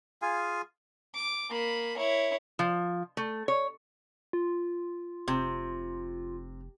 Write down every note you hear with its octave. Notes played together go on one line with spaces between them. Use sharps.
F4 G#4 F5 G#5
D6
A#3 B5
E4 C#5
F3
A3
C#5
F4
F1 C3